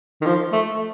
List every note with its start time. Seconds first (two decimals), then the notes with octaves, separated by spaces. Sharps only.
0.21 D#3
0.26 F3
0.52 A3